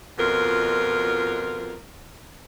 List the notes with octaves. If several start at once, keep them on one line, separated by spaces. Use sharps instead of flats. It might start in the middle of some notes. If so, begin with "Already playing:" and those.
F2 B2 F4 A#4